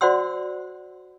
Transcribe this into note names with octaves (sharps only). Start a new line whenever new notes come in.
F#4 C5 D5 F#5 C6 E6